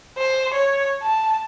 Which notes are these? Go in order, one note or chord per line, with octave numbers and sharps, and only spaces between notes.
C5
C#5
A5